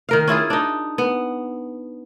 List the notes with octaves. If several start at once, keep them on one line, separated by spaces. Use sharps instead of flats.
D#3 A#4 F5
C#4 E4 F4 G#4
D4 D#4
B3